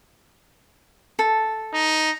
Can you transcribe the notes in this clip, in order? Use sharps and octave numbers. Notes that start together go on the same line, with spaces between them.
A4
D#4